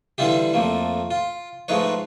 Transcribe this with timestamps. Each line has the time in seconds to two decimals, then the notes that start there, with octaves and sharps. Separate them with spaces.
0.18 D3 E3 G3 E4 F4 G4
0.54 F2 F3 A3 A#3
1.11 F4
1.68 G#2 F3 A3 D#4 B4 C#5